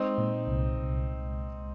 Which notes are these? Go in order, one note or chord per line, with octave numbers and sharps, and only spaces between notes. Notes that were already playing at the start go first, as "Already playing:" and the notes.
Already playing: G#3 C4 D#4
A#2
C2
C2